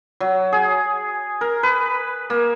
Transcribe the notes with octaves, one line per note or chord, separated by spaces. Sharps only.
F#3
G#4
A#4
B4
A#3